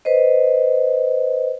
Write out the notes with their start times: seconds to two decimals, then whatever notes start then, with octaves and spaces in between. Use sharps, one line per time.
0.05 B4 C5 D#5